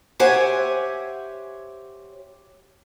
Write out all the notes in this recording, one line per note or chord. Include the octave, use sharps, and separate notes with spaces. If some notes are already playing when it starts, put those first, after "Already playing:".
G4 C5 C#5 E5 F#5 G#5